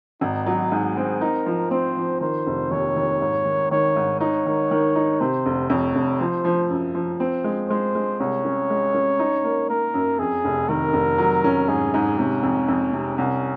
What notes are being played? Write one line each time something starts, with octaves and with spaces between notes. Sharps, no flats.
G#1 D#4
F#3
G#2 G#4
C4
D#4 A#4
F3
C4 C5
F3
D#3 C5
F1
D#2 C#5
D#2
G#2
D#3
D#3 C#5
G#2
D#4 C#5
D#3
D#3
D#4
C3 C5
F1
F2 C#5
F1
F3 C5
F3
F#2
F3
C4
G#3
G#3 C5
G#3
C2 C#5
C#4
G#3
C#4
D#4
A#3
A#3 A#4
F#2
F2 G#4
F1
D#3 A#4
F1
F#3
C#4
G#2 G#4
G#2
C3 C#4
F2
F2
C3
C2 C#4